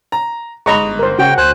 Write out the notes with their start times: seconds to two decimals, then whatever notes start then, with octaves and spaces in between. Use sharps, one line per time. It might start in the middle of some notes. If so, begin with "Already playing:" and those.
0.12 A#5
0.66 G1 G#2 D#5 A#5 B5 C#6
0.99 A#4 C5
1.19 C#3 F#4 G5
1.38 D2 C5 G#5 F#6